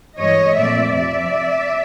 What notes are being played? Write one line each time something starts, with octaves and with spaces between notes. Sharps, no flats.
G2 E3 G#3 C#5 D#5
A#2 F3 A3 C4 D5 E5
F2 C3 F3 D5 E5